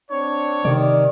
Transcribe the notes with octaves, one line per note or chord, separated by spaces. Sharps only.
C4 D4 C#5
C3 D#3 D5